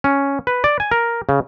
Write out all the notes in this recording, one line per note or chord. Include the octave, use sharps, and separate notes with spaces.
C#4
B4
D5
G#5
A#4
C#3